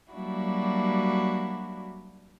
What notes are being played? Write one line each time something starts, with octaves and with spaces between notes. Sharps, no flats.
F#3 G3 A#3 D4 E4 F#4